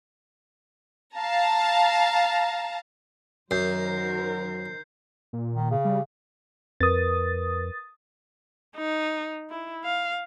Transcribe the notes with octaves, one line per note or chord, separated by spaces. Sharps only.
F5 A5 A#5
F#2 D#3 F#3 A#4 C5 G6 C7
A#2
D#3
C#3
G3
F2 A#4 B4 D#6 A6
D#4
E4
F5